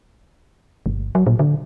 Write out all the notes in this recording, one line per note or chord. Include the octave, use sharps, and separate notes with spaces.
G1
F#3
A#2
D3